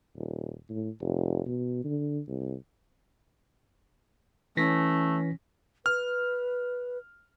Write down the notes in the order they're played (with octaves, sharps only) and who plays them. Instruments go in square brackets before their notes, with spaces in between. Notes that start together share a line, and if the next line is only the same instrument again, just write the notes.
[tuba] D#1
A2
F1
B2
D3
C2
[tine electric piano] E3 A#6 B6 [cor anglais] A3 [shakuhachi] C#4
[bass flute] B4 [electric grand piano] F6